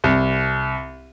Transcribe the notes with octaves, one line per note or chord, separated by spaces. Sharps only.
C2